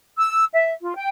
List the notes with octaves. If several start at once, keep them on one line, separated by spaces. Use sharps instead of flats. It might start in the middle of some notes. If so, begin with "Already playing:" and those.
E6
E5
F4
G5